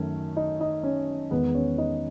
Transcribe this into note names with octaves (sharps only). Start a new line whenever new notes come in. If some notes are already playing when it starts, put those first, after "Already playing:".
Already playing: F#2 D#3 A3 C#4
D#4 D#5
D#4 D#5
C#4 C#5
E2 D#3 G#3 B3 B4
C#4 C#5
D#4 D#5